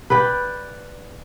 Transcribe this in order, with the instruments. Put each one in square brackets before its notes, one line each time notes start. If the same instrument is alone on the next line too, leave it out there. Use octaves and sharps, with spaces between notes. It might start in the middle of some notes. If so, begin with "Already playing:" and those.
[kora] B4 D5 G5